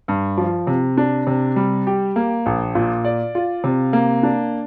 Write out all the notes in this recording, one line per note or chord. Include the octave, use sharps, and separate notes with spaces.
G2
F3
C3
D4
C3
G3
G4
A#3
A#1
A#2
D5
F4
C3
A#3
D4